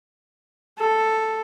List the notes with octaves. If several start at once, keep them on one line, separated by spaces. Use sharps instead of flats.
A4